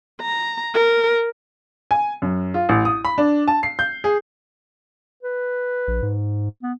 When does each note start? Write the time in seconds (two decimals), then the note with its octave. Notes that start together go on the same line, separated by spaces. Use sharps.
0.22 A#5
0.74 A#4
1.91 G#5
2.22 F#2
2.54 F4
2.69 A1
2.85 D#6
3.05 B5
3.18 D4
3.48 A5
3.63 C7
3.79 G6
4.04 G#4
5.23 B4
5.88 A#1
6.02 G#2
6.63 B3